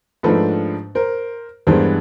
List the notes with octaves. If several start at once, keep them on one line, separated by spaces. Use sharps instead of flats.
G#2 F3 A3 D4 A4 B4
A#4 C5
G2 E3 G#3 B3 D4 A#4 C5